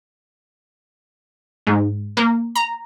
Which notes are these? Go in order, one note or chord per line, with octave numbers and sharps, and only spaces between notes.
G#2
A#3
A#5